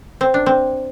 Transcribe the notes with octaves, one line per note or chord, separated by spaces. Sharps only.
C4
D4
C4